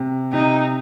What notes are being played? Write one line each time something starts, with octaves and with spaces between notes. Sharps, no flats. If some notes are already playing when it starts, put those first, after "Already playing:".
Already playing: C3
C3 D#4